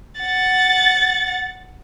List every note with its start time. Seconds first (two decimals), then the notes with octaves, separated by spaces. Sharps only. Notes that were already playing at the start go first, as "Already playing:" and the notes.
0.21 F#5 A6